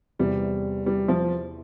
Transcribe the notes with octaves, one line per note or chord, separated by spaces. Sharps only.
E2 C3 E3 G3
G3
F3